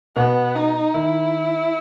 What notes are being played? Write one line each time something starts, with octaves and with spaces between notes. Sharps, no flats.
B2 B3
D#4
D#3 E4